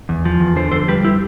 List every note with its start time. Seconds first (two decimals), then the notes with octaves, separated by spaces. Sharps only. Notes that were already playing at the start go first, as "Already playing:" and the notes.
0.09 E2
0.25 F3
0.40 E2
0.56 D3 C5
0.71 F2 A4 C5
0.88 G3 G4 B4
1.05 E4 G4